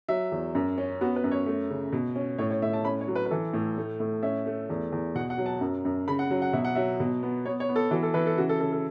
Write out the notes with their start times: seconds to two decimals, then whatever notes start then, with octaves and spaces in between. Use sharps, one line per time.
0.09 F#3 E5
0.32 E2
0.55 F#2
0.78 C#4
1.01 B3 F#4
1.16 B4
1.24 F#2
1.31 C#5
1.46 A3
1.70 C#3
1.92 B2
2.16 C#4
2.38 A2 C#5
2.50 C#5
2.62 A2 E5
2.73 A5
2.85 C#4 B5
3.01 C#5
3.08 F#3
3.15 B4
3.26 B4
3.31 E3 A4
3.53 A2
3.78 A3
4.00 A2
4.23 C#4 E5
4.46 A3
4.70 E2
4.92 E2
5.15 B2 F#5
5.30 F#5
5.38 F#3
5.46 A5
5.61 F#2
5.85 F#2
6.08 C#3 B5
6.19 F#5
6.31 F#3
6.42 F#5
6.53 B2 E5
6.65 F#5
6.75 F#3 E5
7.00 B2
7.23 B3
7.46 B3 C#5
7.60 C#5
7.69 B3
7.76 A4
7.91 E3 F#4
8.03 A4
8.14 E3 B4
8.27 A4
8.38 C#3 F#4
8.49 A4
8.60 C#3 A4
8.72 A4